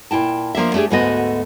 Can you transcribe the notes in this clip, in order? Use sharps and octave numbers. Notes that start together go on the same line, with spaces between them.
A#2 E4 G5 A5
F3 A#3 D4 E5
A3 D4 G4 G#4
D2 G#2 A3 B3 F#4 D#5